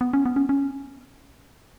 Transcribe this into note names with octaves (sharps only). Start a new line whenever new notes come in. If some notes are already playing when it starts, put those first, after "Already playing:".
B3
C#4
B3
C#4
C#4